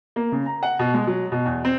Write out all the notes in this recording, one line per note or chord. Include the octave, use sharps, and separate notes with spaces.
A#3
C#3
A#5
F#5
B2
G#3
F#3
B2
E2
C4